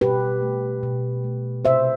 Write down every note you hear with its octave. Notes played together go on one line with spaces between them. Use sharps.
B2 G4 B4
A3
B2
A3
C3 C5 E5